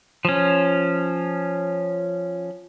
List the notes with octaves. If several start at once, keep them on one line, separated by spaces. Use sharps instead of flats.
F3 C#4